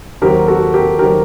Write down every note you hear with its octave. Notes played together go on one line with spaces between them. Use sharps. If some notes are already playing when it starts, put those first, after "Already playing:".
D#2 D#3 F#3 C4 G4 A#4
F#4 A4
G4 A#4
D#3 F#3 C4 G4 A#4